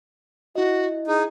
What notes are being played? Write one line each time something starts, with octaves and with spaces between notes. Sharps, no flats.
E4 F#4 D#5
D#4 G#4